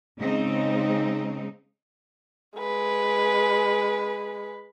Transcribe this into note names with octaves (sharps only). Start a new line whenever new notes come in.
C#3 G#3 C4 D#4
G#3 B4